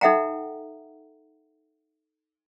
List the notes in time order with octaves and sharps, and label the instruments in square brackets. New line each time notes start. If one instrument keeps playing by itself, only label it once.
[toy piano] D#4 A4 E5 F#5 G5 A#5